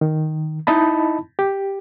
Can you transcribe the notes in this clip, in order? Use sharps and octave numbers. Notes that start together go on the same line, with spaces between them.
D#3
D#4 E4 D#5 A5 B5
G4